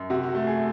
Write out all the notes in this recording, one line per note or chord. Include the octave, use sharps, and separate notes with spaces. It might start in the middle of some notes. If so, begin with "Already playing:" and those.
Already playing: F#2
C3 F#4
F#4
A3
G#4